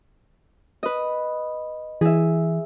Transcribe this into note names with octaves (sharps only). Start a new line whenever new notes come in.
B4 D#5
E3 G#4 E5